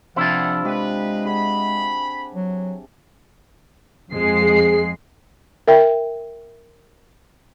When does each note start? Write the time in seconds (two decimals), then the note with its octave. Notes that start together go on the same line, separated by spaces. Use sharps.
0.16 C3 F3 B3 D4 E4 F4 F#5
0.65 G#3 G4 B4
1.25 G#4 F#5 B5
2.34 F#3
4.12 F2 G#3 C7
4.42 G#4
5.68 A#4 E5 G5